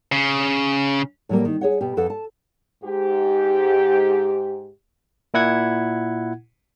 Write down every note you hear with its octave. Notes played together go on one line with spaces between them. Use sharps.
C#3
A2 F#3 G3 A#3
D#3
G#4 C#5 F#5
B2 G4
F2 A4 B4 F5 F#5
A5
G#2 G4
A#2 E4 F#5 G#6